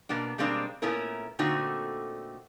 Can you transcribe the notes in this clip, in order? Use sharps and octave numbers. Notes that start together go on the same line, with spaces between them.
B2 A#3 B3 D4
B2 G3 G#3 A#3 C4 D4
A#2 A3 B3 C#4 E4 A#4
A#2 D3 A3 C4 D#4 F#4